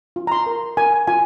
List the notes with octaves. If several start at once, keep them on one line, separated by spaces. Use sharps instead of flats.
F4
A#5
C6
A#4
A#4 G#5
F4 G#5